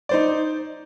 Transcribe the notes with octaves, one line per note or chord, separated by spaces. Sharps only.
D#4 C5 D5